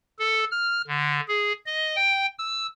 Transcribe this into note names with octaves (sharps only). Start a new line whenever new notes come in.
A4
F6
D3
G#4
D#5
G5
E6